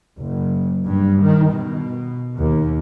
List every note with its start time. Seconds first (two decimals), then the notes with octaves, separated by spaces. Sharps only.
0.19 F#1
0.86 G2
1.22 D#3
1.52 B2
2.37 D#2